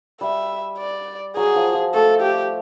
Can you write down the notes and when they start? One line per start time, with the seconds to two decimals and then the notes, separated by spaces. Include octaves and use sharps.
0.21 G3 E5
0.78 D5
1.37 F#3 G#4
1.56 F3
1.74 F3
1.94 A3 A4
2.22 G4